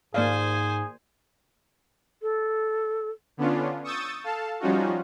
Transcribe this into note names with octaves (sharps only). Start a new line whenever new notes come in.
G#2 A#3 G#4 C5 D5 F5 G#5
A4
D3 B3 C#4 D4 F4
C#6 D#6 E6 G6 A6
A4 F5 A5
F3 G3 C#4 D#4 F4 F#4